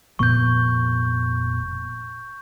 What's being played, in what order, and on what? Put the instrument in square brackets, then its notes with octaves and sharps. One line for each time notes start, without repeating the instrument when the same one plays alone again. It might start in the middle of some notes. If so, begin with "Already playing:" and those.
[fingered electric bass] F1 A#2 B3 [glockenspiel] C#6 G6